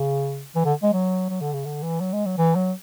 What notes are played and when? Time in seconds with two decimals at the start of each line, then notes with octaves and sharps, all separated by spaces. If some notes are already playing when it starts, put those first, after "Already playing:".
Already playing: C#3
0.56 E3
0.65 D3
0.83 G#3
0.93 F#3
1.29 F#3
1.41 D3
1.53 C#3
1.65 D3
1.83 E3
2.01 F#3
2.13 G#3
2.26 F#3
2.38 E3
2.56 F#3